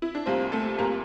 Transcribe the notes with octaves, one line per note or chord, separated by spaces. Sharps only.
E4
D4
C2 A#2 G3 A#3 C4
A3 A4
C2 A#2 G3 A#3 A#4